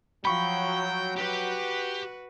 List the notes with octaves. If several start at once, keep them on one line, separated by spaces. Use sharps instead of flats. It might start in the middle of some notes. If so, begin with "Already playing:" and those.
F3 F#3 G5 B5 C#6
F#4 G4 B4